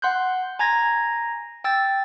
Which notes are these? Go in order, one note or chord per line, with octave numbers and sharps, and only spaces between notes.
F#5 C6 F#6 G6
G#5 A#5 G#6 A#6
G5 E6 A6